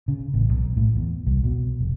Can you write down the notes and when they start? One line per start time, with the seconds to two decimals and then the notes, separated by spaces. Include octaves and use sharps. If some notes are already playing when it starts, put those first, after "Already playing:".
0.08 C#3
0.34 A1
0.49 B1
0.77 A2
0.96 E2
1.26 C2
1.44 B2
1.80 F1